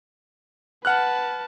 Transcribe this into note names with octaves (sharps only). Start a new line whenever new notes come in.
B4 F#5 A5 F6 F#6